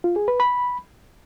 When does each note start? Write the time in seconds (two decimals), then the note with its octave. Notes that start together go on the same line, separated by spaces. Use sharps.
0.04 F4
0.16 G#4
0.28 B4
0.40 B5